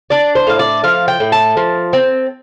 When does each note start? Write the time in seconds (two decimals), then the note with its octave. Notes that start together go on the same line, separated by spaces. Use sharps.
0.10 D4 D5
0.35 C5
0.47 A2 F5
0.59 D5
0.84 F3 F5
1.08 G5
1.20 A2
1.32 A5
1.57 F3
1.93 C4